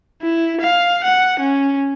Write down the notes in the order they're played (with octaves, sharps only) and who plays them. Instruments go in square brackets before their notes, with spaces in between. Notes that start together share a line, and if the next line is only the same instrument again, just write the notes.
[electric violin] E4
F5
F#5
C#4